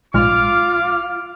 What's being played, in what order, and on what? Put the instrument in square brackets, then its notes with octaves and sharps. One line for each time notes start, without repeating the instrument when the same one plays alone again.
[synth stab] A#1 G#2 [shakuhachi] F4 [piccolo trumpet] D6 [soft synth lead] F6